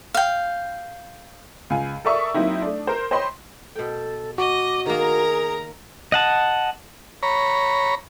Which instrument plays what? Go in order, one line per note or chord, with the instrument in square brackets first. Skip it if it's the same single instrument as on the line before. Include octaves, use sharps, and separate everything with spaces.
[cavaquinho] F5 G5
[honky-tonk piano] C#2 F5 G#5
A4 A#4 D5 E5 C#6 D#6
F#3 A#3 C4 D#4 E4
A3 D4
A#4 C5
C5 C#5 D#5 G5 B5 C6
[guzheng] B2 G5 [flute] A4
[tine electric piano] F#4 [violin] D#5 [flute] D6
[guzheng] D#3 A#3 [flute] G#4 [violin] A#4 A#5
[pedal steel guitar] D#5 F#5 A5
[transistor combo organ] C#5 A#5 B5